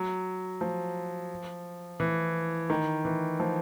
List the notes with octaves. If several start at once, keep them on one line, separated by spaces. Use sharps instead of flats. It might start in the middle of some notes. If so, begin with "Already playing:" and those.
Already playing: F#3
F3
E3
D#3
E3
F3